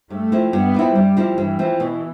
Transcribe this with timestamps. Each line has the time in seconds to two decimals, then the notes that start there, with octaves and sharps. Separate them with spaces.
0.10 G2 A3
0.32 F3 C4 E4
0.53 G2 B3
0.74 F3 C4 E4
0.95 G2 G3
1.17 F3 C4 E4
1.38 G2 E3
1.59 F3 C4 E4
1.80 B2